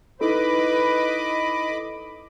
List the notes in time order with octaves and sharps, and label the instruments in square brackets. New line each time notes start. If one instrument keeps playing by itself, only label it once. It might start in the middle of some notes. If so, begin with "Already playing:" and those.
[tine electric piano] D#4 E4 A4 [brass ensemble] B4 [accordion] D#5 B5 D6